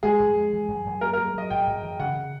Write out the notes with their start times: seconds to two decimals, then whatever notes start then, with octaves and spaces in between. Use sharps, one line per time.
0.03 G#3 G#4
0.20 F2
0.35 G#3
0.52 E3
0.68 F#2
0.85 F#2
1.01 A#3 A#4
1.13 A#4
1.17 F#3
1.34 F#3 D#5
1.50 F#2 G5
1.67 F#2
1.83 E3
1.99 C#3 F#5
2.15 C#3